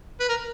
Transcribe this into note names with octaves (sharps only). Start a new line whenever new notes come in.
B4
A#4